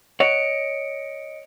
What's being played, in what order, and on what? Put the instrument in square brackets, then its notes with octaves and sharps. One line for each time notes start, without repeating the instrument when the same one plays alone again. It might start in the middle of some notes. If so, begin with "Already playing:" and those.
[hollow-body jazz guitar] C#5 F#5 [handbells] D#5 C#7 D7